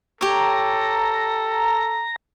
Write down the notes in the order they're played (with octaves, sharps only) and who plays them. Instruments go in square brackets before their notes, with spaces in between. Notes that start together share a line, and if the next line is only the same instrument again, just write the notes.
[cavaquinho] G4 C#5 [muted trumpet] A4 [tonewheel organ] A#5